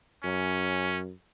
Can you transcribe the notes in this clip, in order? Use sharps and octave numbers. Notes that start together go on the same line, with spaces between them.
F#2 C#4